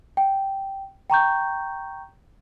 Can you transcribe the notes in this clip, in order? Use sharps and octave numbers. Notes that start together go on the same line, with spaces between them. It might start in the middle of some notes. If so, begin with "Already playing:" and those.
G5
G5 A#5 C#6 G6